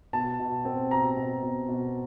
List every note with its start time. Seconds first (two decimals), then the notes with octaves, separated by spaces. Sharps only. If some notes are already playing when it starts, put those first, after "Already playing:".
0.13 B2 A5
0.39 B2
0.65 C4
0.91 B2 A#5
1.17 B2
1.42 B2
1.68 B2